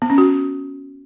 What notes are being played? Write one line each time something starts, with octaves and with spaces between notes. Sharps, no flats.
B3
C#4
F#4